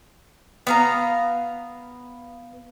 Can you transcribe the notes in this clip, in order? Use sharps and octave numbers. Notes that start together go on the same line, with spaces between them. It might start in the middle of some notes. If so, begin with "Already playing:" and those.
B3 F5 A#5